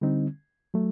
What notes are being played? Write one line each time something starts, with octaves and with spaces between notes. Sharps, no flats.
D3 G3 C4 D#4
F#3 A3